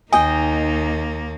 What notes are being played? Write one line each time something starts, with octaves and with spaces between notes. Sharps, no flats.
D#2 A#3 D#4 D#5 G5 G#5